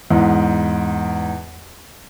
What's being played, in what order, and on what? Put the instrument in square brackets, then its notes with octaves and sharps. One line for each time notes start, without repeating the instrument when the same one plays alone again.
[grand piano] E2 G#2